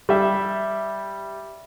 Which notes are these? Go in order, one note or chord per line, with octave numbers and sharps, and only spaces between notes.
G3 E5